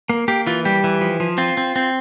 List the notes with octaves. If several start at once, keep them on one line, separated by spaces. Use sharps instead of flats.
A#3
A#3 G4
E3 F4
G3 G4
E3
F3
F3
C4 F4
C4
C4